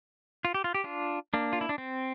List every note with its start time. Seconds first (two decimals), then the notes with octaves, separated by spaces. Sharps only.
0.45 F4
0.54 G4
0.64 F4
0.75 G4
0.84 D4 F4
1.34 A#3 D4
1.53 F4
1.61 E4
1.69 D4
1.78 C4